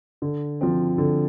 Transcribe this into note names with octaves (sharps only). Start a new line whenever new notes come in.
D3
F3 C4
D3